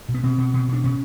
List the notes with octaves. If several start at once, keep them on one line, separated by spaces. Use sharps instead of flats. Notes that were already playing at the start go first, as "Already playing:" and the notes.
B2
B3
B2 C4
B2
B2
B2 D4
B2 C#4